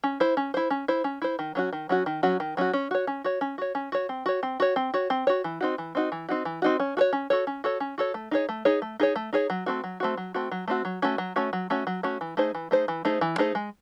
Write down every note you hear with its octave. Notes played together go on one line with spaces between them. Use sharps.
C#4
E4 C5
C#4
E4 C5
C#4
E4 C5
C#4
E4 C5
D#3
F#3 C#4 F#4
D#3
F#3 C#4 F#4
D#3
F#3 C#4 F#4
D#3
F#3 C#4 F#4
C#4
F#4 C#5
C#4
F#4 C#5
C#4
F#4 C#5
C#4
F#4 C#5
C4
F#4 C#5
C4
F#4 C#5
C4
F#4 C#5
C4
F#4 C#5
E3
C4 D#4 F#4
E3
C4 D#4 F#4
E3
C4 D#4 F#4
E3
C4 D#4 F#4
C#4
F#4 A4 C#5
C#4
F#4 A4 C#5
C#4
F#4 A4 C#5
C#4
F#4 A4 C#5
A3
D#4 G#4 C#5
A3
D#4 G#4 C#5
A3
D#4 G#4 C#5
A3
D#4 G#4 C#5
F#3
A3 C4 F#4
F#3
A3 C4 F#4
F#3
A3 C4 F#4
F#3
A3 C4 F#4
F#3
A3 C#4 F#4
F#3
A3 C#4 F#4
F#3
A3 C#4 F#4
F#3
A3 C#4 F#4
E3
A3 D#4 G#4 C5
E3
A3 D#4 G#4 C5
E3
A3 D#4 G#4 C5
E3
A3 D#4 G#4 C5
G#3